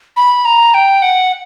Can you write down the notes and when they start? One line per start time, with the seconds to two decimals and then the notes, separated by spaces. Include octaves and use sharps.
0.17 B5
0.45 A#5
0.74 G5
1.02 F#5